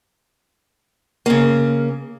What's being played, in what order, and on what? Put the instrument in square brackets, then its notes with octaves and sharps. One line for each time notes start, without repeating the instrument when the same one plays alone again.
[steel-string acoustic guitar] C#3 A#3